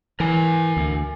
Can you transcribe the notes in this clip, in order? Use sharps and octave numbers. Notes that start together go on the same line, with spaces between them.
E3 A#4 G#5
D2